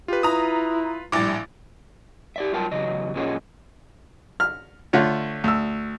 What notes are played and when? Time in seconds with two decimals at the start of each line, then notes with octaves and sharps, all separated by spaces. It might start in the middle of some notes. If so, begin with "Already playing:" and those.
0.08 F4 G4 B4
0.23 E4 A#5 D#6
1.12 A#1 A2 G3 D6 A6
2.36 G4 D5 E5
2.53 F#3 G3 F4 A#4 G5 A5
2.71 E2 C#3 F#3 D#5
3.15 A#2 C#4 F4 G#4 C#5 D#5
4.40 F6
4.93 D3 A3 F4 C#5
5.44 D2 E6